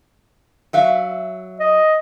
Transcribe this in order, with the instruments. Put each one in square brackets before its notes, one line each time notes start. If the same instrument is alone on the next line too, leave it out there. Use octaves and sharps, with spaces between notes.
[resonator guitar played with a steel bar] F#3 E5 F5
[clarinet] D#5